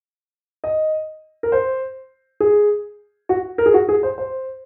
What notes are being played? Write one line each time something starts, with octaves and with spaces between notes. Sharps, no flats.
D#5
A#4
C5
G#4
F#4
A#4
G#4
F#4
G#4
C5
C5